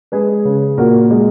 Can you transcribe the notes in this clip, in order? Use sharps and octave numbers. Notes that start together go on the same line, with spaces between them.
G#3 G#4 B4
C#3
A#2 F#4 A#4
G#3